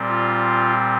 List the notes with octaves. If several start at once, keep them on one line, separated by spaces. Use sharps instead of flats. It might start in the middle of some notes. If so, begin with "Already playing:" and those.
Already playing: A#2 G3 C4
F4